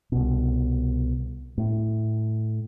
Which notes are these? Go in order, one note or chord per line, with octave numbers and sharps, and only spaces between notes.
C2 B2
A2